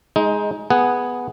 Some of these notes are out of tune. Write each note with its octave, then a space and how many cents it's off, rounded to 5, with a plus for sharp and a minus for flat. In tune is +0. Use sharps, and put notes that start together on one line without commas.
G#3 +0 D#4 +20
B3 +0 G#4 +0 F#5 +0